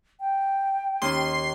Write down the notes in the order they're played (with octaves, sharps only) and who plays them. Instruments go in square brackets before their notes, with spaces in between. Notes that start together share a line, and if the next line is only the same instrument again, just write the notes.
[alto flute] G5
[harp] D#2 C#4 [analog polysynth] C6